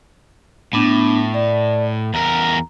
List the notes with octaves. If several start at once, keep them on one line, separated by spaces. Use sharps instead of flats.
A2 B3 D4
D5
E2 A#4 A#5